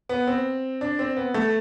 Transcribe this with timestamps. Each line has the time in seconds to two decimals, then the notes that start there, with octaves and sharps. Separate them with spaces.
0.09 B3
0.27 C4
0.81 D4
0.99 C4
1.17 B3
1.34 A3